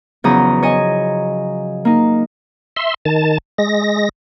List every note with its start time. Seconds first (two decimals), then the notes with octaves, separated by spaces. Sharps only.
0.24 E2 C#3 F3 F#3 A#5 D#6
0.62 C#5 D#5 G#5
1.85 A#3 D#4
2.76 E5 C6
3.06 D#3 A5
3.58 G#3 A#6